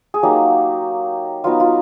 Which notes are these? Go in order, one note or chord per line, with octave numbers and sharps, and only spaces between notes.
G#4
F#3 A#3 D#4 G4
F#3 B3 D#4 F4
F4